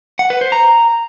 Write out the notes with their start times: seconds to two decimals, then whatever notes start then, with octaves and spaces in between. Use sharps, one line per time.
0.19 F#5
0.30 B4
0.41 C5
0.52 A#5